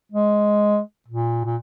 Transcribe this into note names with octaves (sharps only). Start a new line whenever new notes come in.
G#3
A#2
A#2